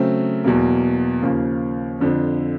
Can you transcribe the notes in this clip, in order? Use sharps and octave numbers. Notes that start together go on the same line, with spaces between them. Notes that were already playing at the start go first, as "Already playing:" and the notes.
Already playing: C#3 F#3 A3 C4
E2 B2 F#3 A#3
D#2 C#3 F3 A#3
F2 D3 F3